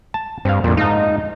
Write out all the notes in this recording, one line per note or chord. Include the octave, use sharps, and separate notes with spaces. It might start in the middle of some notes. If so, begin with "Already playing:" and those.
A5
G2 C4 F5
F2 A#2 D3
G#2 D#4 F5 A5